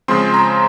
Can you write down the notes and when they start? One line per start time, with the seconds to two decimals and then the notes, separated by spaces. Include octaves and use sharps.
0.08 C#3 F3 G#3 C4 C6
0.34 A#5